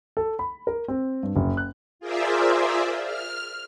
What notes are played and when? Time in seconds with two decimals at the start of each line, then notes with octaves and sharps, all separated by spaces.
0.17 A4
0.39 B5
0.67 A#4
0.88 C4
1.23 G2
1.36 F#1
1.57 F#6
1.99 F4 G#4 A#4 C5 D5 E5
3.04 F6